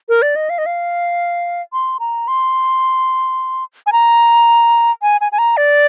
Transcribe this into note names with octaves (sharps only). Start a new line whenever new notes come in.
A#4
D5
D#5
F5
D#5
F5
C6
A#5
C6
G#5
A#5
G#5
G#5
G#5
A#5
D5